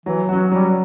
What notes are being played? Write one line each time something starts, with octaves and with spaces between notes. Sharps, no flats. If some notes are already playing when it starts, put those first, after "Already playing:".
E3 F#3
F#3 C#4 F#4
F#3 G3